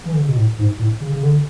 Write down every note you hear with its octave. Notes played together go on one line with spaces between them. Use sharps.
E3
D3
C#3
B2
A2
G#2
A2
C#3
C#3
D3